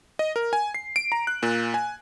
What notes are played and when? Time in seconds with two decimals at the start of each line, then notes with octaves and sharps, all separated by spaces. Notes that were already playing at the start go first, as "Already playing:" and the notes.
0.19 D#5
0.36 A#4
0.53 G#5
0.74 C7
0.96 D7
1.12 A#5
1.27 F#6
1.43 A#2
1.74 G#5